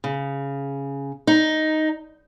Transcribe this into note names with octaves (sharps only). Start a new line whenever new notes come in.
C#3
D#4